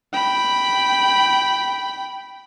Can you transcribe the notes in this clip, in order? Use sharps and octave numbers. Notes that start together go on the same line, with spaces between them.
G5 B5